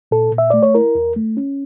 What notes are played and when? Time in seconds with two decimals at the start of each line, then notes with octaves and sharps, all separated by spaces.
0.11 A#2 A4
0.32 A#2
0.38 E5
0.50 A3 D5
0.63 C#5
0.75 E4 A#4
0.95 E2
1.16 A3
1.37 C#4